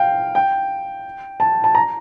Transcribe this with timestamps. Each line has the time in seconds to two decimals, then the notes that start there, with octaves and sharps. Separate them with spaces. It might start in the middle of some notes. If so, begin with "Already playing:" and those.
Already playing: F5 G5
0.35 G5
1.40 A5
1.64 A5
1.75 A#5